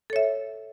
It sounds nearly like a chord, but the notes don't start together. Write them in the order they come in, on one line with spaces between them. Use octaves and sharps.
A4 C#5 E5